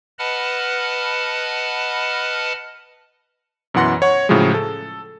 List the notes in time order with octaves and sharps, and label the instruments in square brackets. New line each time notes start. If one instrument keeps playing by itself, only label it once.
[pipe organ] B4 D#5 F#5 A5 B5 F6
[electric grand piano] F#2 B2 E3 F#5 C6 A#6
C#5 F#5 C#6
A2 C#3 F3 F#3 G#3
A4